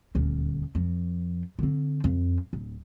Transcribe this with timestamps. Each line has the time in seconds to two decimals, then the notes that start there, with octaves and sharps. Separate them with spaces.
0.15 D#1 D2
0.75 F2
1.59 D3 C4
2.04 F2
2.53 D1